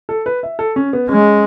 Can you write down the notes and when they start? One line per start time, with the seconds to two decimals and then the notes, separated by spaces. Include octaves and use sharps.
0.09 A4
0.26 B4
0.43 E5
0.59 A4
0.76 C#4
0.93 B3
1.09 G#3 C#4